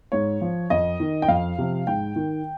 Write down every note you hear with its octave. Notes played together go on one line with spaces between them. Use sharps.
G#2 C#5
F3
F2 D#5
D#3
G5
F2 F5
C3 F3
G#2 G5
D#3